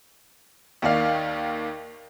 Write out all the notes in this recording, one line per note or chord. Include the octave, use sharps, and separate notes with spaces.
D#2 D#3 A#3 D5 F5